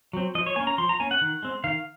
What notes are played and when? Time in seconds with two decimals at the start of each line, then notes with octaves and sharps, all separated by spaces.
0.13 F#3 C4
0.35 F3 D#5
0.46 C#5
0.56 A#3 C#4 G#5
0.67 A#5
0.78 F3 C6
0.89 A#5
1.00 A#3 C#4 G#5
1.11 F#5
1.21 D#3
1.43 G#3 C4
1.64 D#3 F5